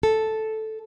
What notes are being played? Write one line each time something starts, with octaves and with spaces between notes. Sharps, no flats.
A4